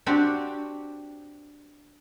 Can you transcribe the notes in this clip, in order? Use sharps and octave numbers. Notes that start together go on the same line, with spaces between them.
C4 D4 F#4 G4